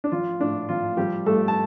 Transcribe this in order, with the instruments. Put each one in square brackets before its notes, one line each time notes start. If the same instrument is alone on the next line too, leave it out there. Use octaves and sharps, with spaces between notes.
[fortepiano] D4
F3 F4
A2 D4
F3 F4
F3 G3 G4
G2 A3 A4
A5